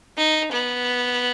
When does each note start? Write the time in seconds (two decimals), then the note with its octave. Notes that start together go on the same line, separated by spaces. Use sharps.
0.17 D#4
0.52 B3